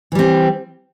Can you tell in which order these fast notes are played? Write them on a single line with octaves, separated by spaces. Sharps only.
E3 G3 C4